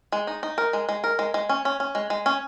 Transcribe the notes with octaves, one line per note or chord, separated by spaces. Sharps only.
G#3
D#4
D#4
A#4
G#3
G#3
A#4
G#3
G#3
C#4
C#4
C#4
G#3
G#3
C#4